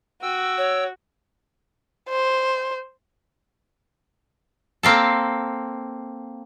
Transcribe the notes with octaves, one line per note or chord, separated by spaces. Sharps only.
F#4 G5 E6
C#5
C5
A#3 C4 A4